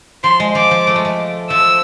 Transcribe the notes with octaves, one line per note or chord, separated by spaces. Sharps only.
F3 C6
G#3
F3 D6
F3
A3
G#3
A3
F3 E6